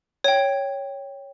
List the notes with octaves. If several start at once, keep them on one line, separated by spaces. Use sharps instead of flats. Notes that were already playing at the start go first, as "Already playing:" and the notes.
C#5 G5